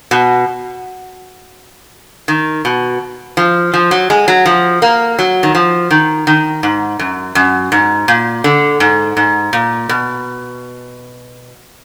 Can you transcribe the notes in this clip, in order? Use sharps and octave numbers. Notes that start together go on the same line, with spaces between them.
B2
D#3
B2
F3
F3
F#3
G#3
F#3
F3
A#3
F#3
D#3
F3
D#3
D#3
G#2
F#2
F#2
G#2
A#2
D3
G#2
G#2
A#2
B2